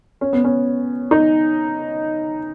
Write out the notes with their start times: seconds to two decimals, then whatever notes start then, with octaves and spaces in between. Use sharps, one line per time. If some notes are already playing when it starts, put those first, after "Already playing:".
0.21 C#4
0.33 B3
0.44 C#4
1.11 D#4